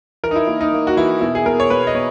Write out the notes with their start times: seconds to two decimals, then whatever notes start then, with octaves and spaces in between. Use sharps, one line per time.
0.23 E3 A#4
0.31 D#4
0.36 E4
0.47 A#3 E4
0.61 D#4
0.73 A#3
0.87 F#4
0.97 E3 E4
1.21 B2 E4
1.35 G#4
1.45 B2 A#4
1.60 C#5
1.70 B2 B4
1.87 D#5
1.94 B2 C#5